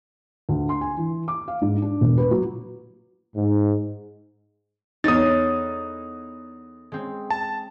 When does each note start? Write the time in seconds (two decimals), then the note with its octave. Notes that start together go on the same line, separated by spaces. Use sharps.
0.49 D2
0.69 C6
0.81 G#5
0.97 E3
1.28 D6
1.48 F5
1.62 G#2
1.82 D4
2.01 E1
2.18 B4
2.31 F#3
3.36 G#2
5.04 E2 D#4 A4 C#5 D#6 A6
6.92 G#3 C4
7.30 A5